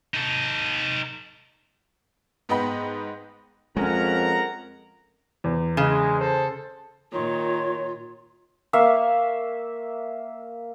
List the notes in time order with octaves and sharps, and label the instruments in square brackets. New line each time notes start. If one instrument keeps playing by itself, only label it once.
[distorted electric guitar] D#4 A4
[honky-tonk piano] G#2 B3 D#5 G5 B5
[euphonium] F2 [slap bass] G#3 [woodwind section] C#4 [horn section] A#4 F#5 A#5
[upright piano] E2
[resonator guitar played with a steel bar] C#3 [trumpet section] G#3
[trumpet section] A4 C5
[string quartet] A#2 D#3 [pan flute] F4 [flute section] C#5
[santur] A#3 E5 F5 C#6